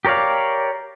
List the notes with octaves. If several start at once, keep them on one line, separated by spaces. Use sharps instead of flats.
G4 A#4 C#5 D5 F5